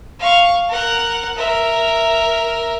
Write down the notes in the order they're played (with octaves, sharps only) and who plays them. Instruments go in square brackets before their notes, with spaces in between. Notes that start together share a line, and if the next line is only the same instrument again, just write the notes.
[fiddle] F5 C#6
A#4 F#5
A#4 E5